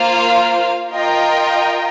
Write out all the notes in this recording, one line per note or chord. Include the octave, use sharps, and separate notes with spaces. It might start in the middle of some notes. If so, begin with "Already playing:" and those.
Already playing: A#3 F4 C5 F5
F4 A#4 D#5 G5